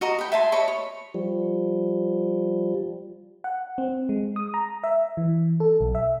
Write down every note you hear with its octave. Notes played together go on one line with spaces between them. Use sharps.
F#4 D#5 A#5 D#6
G5 B5
E5 G#5 A5 C6
C#5 D#5 B5 C#6
C#5
F3 G3
F#5
C4
G#3
D#6
A#5
E5
E3
A4
B1
E5